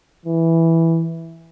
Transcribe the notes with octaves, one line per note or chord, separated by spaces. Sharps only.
E3